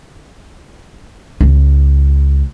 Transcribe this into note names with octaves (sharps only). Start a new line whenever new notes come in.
C#2